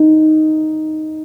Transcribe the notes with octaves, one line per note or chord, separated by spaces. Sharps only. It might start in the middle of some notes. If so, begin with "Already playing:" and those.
Already playing: D#4